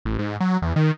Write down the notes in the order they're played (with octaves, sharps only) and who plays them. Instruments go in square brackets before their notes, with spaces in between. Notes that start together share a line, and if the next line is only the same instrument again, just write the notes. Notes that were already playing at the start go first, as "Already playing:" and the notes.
[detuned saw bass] A1
G#2
F#3
E2
D#3